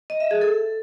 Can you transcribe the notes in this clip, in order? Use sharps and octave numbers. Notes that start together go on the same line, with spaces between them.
D#5
E5
G#4
A4